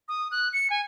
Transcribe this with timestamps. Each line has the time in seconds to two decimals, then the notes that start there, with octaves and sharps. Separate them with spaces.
0.08 D#6
0.31 F#6
0.53 C#7
0.70 G#5